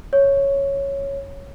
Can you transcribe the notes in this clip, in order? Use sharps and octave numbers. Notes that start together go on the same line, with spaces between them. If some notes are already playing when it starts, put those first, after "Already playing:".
C#5